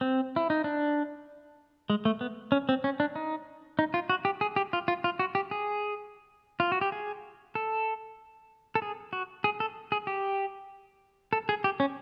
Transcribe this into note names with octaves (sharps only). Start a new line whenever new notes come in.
C4
E4
D#4
D4
G#3
A3
B3
C#4
C4
C#4
D4
D#4
D#4
F4
F#4
G4
G#4
G4
F4
F4
F4
F#4
G4
G#4
F4
F#4
G4
G#4
A4
A4
G#4
F#4
G#4
A4
G#4
G4
A4
G#4
G4
C#4